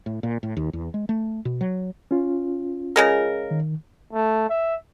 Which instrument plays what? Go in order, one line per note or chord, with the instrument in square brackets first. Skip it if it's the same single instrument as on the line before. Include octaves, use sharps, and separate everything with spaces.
[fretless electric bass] A2
A#2
A2
D#2
E2
G#3
A3
B2
F#3
[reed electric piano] C#4 F4
[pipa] C#3 G#3 A#4
[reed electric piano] D#3
[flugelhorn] A3
E5